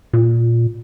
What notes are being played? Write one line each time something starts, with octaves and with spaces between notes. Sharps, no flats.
A#2